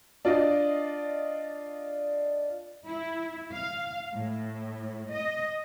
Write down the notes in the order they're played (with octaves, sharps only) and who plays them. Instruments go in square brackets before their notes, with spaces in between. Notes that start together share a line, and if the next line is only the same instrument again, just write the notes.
[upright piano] D4 F4 D5 D#5
[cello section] E4
F5
A2
D#5